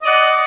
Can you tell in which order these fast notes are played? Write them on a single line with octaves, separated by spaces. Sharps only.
D#5 D5 F#5